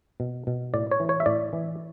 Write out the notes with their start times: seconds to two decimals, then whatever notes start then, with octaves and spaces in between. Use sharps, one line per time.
0.20 B2
0.47 B2
0.74 A2 D5
0.91 C#5
1.00 E3
1.09 C#5
1.20 E5
1.26 A2 D5
1.53 E3